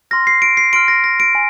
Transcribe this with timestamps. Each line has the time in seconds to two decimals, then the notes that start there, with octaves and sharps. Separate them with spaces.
0.11 C6 F6 A#6
0.27 C7
0.42 D7
0.57 C7
0.73 C6 F6 D7
0.88 A#6
1.04 A#6
1.20 D7
1.35 G#5